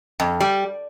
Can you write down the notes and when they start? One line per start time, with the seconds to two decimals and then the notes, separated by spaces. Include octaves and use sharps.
0.20 F2
0.40 G3